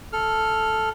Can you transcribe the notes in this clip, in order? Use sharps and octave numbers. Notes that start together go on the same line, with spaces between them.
A4 F6